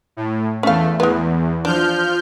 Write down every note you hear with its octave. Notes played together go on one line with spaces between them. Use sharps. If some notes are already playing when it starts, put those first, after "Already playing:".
A2
E2 A3 C#4 F5
E2 G#3 B3
F3 D4 F6 G6